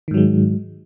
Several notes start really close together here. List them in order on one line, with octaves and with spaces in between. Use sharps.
D#3 G#2 F#3 G#3